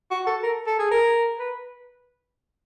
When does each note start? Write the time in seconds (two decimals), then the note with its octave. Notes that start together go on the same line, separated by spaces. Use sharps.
0.11 F#4
0.26 A4
0.43 A#4
0.67 A4
0.79 G#4
0.91 A#4
1.39 B4